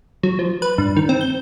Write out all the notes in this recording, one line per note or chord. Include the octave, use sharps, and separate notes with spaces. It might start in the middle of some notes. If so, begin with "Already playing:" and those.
F#3
F3
B4
G2
D#3
C4
G6